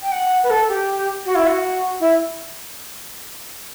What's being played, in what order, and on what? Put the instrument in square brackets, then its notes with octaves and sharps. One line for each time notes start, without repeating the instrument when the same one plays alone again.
[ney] G5
F#5
B4
A4
G4
F#4
E4
F#4
E4